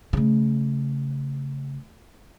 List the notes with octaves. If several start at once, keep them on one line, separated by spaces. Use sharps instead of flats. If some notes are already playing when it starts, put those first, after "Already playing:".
C#3 A3